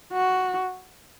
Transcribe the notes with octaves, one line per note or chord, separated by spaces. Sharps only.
F#4